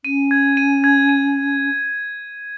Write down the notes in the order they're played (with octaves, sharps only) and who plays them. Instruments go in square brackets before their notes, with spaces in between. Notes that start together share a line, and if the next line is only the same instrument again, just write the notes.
[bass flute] C#4 [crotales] D#7
[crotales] G#6
D#7
G#6
D#7